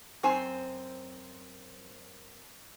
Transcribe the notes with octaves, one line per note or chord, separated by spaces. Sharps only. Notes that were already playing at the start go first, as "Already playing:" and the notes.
F#2 C4 C5 G#5